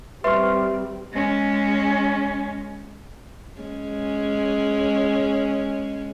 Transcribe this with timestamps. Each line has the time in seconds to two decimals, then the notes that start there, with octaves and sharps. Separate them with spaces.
0.24 G3 C4 G4 B4 E5 C6 F6
1.12 G#3 C#4
3.60 G#3 C#4